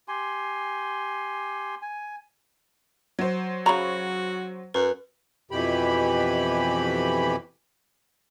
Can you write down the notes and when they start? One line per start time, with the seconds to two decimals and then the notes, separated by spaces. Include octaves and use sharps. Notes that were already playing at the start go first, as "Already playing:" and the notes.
0.08 G4 G#5 C6
1.82 G#5
3.19 F#3 C5
3.66 C#3 F#4 A#5 B5 C#6
4.74 F#2 B4
5.51 F2 B2 E3 G4 B5